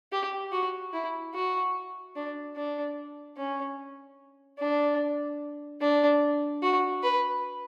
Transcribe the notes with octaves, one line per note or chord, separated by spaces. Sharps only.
G4
F#4
E4
F#4
D4
D4
C#4
D4
D4
F#4
B4